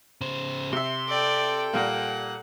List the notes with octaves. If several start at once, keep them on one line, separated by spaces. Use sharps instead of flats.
C#3 C5
C3 E5 C6
A4 D5 G5
A#2 G3 A#3 F#5